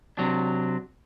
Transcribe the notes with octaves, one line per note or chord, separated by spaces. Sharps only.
C3 F#3 D4